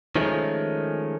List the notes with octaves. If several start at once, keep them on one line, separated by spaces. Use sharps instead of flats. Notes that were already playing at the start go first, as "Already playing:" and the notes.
D#3 F3 G#3 A3 C#4